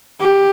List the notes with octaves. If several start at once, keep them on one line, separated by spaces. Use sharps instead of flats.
G4